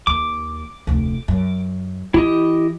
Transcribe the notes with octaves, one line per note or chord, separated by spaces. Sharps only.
D#2 D6
F1 D2
F#2
E3 E4 G4 D#5